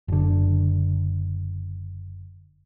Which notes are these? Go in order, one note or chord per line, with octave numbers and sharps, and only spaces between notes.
F#1 D3